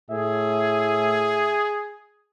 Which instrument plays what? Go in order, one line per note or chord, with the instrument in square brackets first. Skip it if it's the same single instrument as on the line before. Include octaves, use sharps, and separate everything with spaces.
[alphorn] A2 [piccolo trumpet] G#4 [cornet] E5